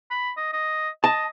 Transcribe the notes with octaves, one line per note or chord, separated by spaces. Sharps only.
B5
D#5
D#5
D#5 A5